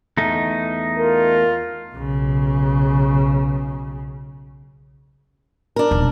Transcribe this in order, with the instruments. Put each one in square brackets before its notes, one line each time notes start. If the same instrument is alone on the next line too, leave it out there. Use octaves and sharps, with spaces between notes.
[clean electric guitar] E2 A3 [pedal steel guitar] D#4
[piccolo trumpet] F4 [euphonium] A#4
[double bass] B1 C#3
[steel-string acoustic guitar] D4 A#4
[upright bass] D#1 B1